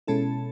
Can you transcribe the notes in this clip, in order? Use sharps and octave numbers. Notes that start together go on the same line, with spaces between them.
B2 G#3 C#4 E4 A4 A5